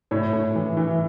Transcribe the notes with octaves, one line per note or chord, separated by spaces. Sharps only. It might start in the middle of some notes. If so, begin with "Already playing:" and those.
A2 C#5
A2
E3
E3